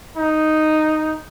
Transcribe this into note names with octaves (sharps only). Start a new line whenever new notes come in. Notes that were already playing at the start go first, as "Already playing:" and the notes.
D#4